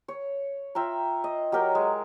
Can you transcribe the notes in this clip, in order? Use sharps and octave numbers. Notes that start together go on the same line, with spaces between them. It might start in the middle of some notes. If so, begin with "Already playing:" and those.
C#5
F4 E5 G5 A#5
D#5
F#3 G4 A#4 G5
G#3